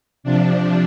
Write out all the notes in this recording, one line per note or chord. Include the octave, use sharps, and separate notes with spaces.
C3 F3 D4